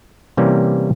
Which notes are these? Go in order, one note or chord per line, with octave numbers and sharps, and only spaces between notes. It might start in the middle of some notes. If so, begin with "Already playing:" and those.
C3 E3 G3 A#3 C#4